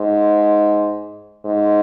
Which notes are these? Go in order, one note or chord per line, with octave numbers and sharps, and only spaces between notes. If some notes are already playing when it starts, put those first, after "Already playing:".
Already playing: G#2
G#2